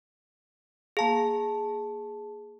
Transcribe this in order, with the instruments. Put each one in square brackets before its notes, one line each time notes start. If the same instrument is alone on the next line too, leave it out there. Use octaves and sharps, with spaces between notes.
[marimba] A#3 F5 [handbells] G#4 A5